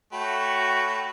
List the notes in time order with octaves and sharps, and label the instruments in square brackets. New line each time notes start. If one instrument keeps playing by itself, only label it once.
[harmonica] A3 [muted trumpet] F#4 [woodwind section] C#5 G5 [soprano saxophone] B5